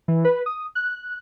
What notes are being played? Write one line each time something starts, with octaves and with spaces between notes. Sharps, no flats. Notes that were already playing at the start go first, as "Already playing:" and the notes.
E3
B4
D#6
F#6